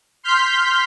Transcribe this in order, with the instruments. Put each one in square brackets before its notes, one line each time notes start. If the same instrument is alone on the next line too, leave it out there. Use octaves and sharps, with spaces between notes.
[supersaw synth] C6 F6 G6 B6